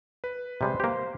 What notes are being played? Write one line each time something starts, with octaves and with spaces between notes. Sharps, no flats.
B4
C3 G3 G#3 C5
A#3 G4